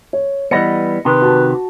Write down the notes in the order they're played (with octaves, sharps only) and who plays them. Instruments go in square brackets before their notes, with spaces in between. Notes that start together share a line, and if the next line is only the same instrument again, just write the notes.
[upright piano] C#5
[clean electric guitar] E3 G3 B3 [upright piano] D#5 A#6 C#7
[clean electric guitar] C3 D#3 G4 [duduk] B4
[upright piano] F#4 A5